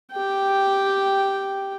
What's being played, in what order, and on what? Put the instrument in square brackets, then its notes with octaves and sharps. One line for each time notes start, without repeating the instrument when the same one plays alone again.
[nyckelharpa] G4 G5